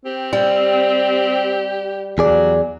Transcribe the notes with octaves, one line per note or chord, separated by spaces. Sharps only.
C4 G4
G3 G4
E2 F#3 G#4 D5